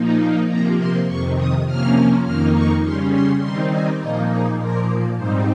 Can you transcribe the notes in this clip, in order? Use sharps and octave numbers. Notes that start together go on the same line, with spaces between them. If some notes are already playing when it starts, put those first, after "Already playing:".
Already playing: A#2 F3 A#3 D#4
C3 F3 A#3 A#5
C6
F2 C3 D#3 C#6
D#6
C3 F3 A#3 C#4 F6
F2 D#3 A#3 D#4 F6
C#6
C#3 G3 C#4 C6
C6
D#3 G3 C4 D#4 C6
G#5
A#2 F3 A#3 D#4 D#5
G#4
A#2 F3 A#3 A#4
G#2 G3 C4 D#4 C5